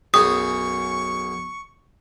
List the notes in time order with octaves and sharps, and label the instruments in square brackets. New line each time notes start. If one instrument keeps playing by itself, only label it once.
[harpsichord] B1 F#2 G#4 [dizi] C#6 [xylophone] D#6